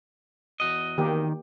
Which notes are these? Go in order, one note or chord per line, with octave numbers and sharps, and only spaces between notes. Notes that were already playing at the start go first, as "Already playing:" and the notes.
E2 F#4 D#5
D#3 A#3 G4